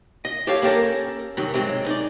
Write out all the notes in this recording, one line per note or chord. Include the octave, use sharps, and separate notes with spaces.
D#5
G4 A4 C#5 F5
A#3 C#4 G4 A4 A#4
F#2 C3 D#3 F#3
G#2 F#3 G#3 C4
D#4 D5